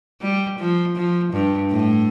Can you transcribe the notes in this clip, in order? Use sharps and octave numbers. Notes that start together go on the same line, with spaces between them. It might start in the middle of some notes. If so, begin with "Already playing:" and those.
G3
F3
F3
G2
A2